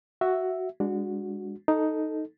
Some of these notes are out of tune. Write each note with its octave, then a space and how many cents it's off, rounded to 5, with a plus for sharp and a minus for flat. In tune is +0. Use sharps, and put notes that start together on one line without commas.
F#4 +5 E5 +0
G#3 -30 D4 +0 F#4 -15
D#4 +5 A4 +0